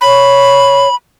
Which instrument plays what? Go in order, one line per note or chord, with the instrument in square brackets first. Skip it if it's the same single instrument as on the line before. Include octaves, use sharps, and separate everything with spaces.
[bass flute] C#5 [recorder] B5